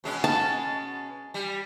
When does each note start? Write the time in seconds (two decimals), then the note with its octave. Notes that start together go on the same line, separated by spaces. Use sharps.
0.04 B2 G#3 C#4
0.24 A5
1.34 G3